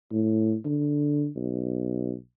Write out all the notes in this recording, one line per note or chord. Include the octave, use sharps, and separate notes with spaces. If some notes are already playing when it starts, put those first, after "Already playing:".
A2
D3
B1